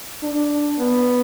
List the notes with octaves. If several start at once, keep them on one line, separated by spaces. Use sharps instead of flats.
D4
B3